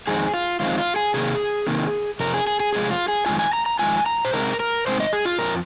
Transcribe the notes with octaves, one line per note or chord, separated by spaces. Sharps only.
F2 D#3 G#3 C4 D#4 G#4
F4
F2 D#3 G#3 C4 D#4 F4
F4
G#4
C3 D#3 A#3 G#4
C3 D#3 A#3
F2 C3 A#4
G#4
G#4
G#4
F2 C3 G#3 F4 G#4
F4
G#4
F2 D#3 G#3 F4 G#5
G#5
A#5
A#5
F2 D#3 G#3 F4 G#5
A#5
C5
C3 G#3 C4 D#4 A#4
A#4
C3 G#3 C4 D#4 C5
D#5
G#4
F4
F2 F3 A#4